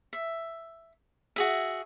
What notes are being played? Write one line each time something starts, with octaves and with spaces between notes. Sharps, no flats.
E5
F#4 G#4 E5